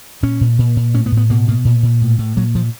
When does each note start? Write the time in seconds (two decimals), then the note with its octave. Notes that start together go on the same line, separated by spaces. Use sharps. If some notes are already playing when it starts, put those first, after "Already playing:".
0.23 A#2 C#4
0.41 A#2
0.59 A#2
0.76 A#2
0.94 A2 C#4
1.06 B3
1.12 A2
1.17 B3
1.30 B2 A#3
1.48 B2 A#3
1.65 A#2
1.83 A#2
2.02 A2
2.18 A2
2.37 A#2 F#3
2.55 A#2 F3